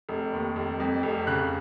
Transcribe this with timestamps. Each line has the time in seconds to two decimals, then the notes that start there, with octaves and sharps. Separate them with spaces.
0.09 F1
0.33 D#2
0.56 F1
0.80 F2
1.03 F1
1.27 C#3 F#6